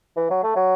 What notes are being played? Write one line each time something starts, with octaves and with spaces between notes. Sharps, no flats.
E3
F#3
A3
F#3